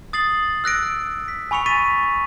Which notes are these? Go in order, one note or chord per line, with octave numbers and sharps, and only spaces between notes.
D#6 A6 C7 F#7
E6 F#6 A#6 D7
B6
G#5 B5 C#6 C#7 F7
C#6 A6 B6 D#7